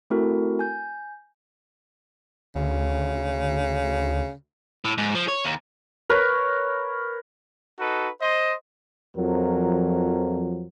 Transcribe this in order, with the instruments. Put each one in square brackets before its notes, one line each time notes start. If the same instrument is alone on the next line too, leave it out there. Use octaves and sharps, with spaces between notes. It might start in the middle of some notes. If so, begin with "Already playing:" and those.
[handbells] A3 C4 E4 F#4 A4 A#4
G#5 G6
[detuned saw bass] D2 [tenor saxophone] C#3
[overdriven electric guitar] A2
G#2
F3
C#5
D#2
[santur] A#4 B4 C#5
[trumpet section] D#4 F#4 A4 B4
C5 D#5
[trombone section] F2 F3 F#3 A#4